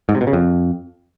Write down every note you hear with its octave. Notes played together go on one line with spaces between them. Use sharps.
G#2
C3
B2
C#3
F2